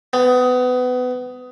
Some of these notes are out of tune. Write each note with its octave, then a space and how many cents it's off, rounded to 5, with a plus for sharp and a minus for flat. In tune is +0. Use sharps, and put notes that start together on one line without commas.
B3 +25